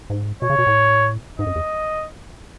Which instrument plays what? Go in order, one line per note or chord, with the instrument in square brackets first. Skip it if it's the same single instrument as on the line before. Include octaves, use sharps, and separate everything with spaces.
[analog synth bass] G#2
[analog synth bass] B2 [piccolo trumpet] C#5
[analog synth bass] C#3
B2
A2
[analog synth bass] G#2 [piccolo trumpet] D#5
[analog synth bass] F#2
E2